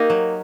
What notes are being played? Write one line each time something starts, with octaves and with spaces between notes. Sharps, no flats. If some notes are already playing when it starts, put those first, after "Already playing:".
Already playing: A#3 D#4 G4 A#4
F#3